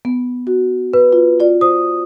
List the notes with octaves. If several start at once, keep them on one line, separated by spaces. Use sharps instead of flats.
B3
F#4
B4
F4
F4 D5
C5 D#6